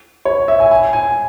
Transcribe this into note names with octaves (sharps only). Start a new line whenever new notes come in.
C#5
E5
G#5
G#5
G#5